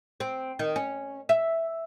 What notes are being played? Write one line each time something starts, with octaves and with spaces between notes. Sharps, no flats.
C4
D#3
C#4
E5